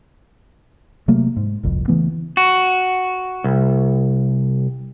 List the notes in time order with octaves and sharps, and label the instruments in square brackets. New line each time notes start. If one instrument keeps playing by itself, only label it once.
[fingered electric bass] C3 F#3 A3 A#3
G#2
G1 C2 F2
C#3 E3 A3 B3
[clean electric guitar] F#4
C2